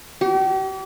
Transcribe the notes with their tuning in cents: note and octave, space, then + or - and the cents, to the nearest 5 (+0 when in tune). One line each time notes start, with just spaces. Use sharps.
G4 -40